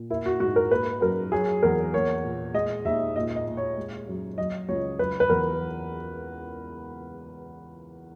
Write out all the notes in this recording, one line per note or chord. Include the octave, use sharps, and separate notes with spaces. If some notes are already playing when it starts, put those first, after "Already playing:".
Already playing: A#2
A#3 E4
F#4
G#2 F#4
A#4
A#3 B4
F#2 A#4
F#3 G#4
E2 A#4
A#3 C#5
A#2
G#3 D#5
D#2 E5
A#2 D#5
D#5
A#2
C#5
G#3
F#2
F#3 D#5
C#2 C#5
F#3 B4
B4
E2 A#4